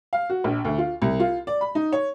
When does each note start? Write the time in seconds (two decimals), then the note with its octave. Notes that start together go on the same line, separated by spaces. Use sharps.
0.13 F5
0.30 F#4
0.44 A#1
0.65 D2
0.78 F4
1.02 C2
1.20 F4
1.47 D5
1.61 B5
1.75 D#4
1.92 C#5